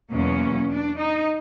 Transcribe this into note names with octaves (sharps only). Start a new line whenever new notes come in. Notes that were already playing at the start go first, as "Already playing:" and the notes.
E2 B2 F#3 A#3 C#4
D4
D#4